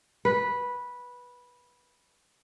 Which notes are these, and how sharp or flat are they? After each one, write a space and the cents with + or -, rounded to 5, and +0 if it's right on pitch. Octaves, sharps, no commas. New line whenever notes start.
B4 -10